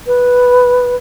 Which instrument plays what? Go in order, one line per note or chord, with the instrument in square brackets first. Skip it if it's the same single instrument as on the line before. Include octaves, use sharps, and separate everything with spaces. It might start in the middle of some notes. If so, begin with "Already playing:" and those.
[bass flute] B4